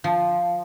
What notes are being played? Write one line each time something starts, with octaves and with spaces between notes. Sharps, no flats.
F3